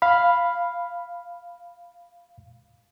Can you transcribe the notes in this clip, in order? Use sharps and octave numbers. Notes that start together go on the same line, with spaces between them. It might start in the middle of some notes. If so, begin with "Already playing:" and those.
F5 B5